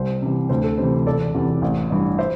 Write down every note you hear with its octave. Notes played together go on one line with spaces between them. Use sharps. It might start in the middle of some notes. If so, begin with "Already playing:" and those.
Already playing: C2 C5
C3 E3
D2 C5
A4
C3 E3 C5
E1 A4 D5
E2 C3 E3
A1
G2 E3
C5 E5